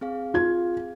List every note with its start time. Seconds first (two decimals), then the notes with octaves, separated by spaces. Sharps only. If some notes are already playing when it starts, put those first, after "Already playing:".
0.01 C4 G#4 F5
0.34 F4 G#6